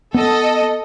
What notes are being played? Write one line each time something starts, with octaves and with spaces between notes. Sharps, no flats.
B3 A4 D#5